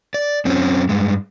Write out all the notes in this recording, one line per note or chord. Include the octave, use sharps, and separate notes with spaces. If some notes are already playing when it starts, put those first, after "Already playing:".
D5
F#2 C4 C#4
G2 G#3